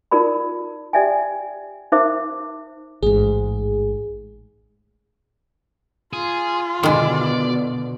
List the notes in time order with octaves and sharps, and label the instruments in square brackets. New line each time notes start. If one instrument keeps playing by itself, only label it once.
[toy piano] D#4 F4 A#4 D5 B5
G4 D5 E5 G5 G#5
D#4 A#4 C5 E5 D6
[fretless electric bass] A1 G#2 [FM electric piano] G#4
[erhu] F4 [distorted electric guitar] G#4
[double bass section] B2 D3 [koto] D#3 G#3 [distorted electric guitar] D5